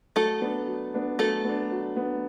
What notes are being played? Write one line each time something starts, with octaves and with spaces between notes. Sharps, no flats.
F#3 A3 A4
B3 D4
F#3
B3 D4
F#3 A3 A4
B3 D4
F#3
B3 D4